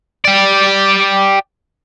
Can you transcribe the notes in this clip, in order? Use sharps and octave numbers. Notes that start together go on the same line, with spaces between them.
G4 D5